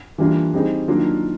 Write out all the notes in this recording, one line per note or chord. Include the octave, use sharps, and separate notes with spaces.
E3 G3 A#3 D4 F4
G3 C4 D#4 G#4
D#3 F#3 A#3 D4 F4